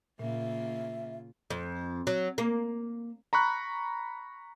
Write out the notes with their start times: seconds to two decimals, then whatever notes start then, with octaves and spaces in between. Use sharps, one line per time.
0.19 A#2 C#3 A#3 F4 E5
1.50 F2
2.07 F#3
2.38 A#3
3.33 A#5 B5 C#6 F#6